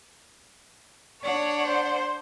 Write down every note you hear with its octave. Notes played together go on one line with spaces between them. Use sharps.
D4 C#5 F#5
C5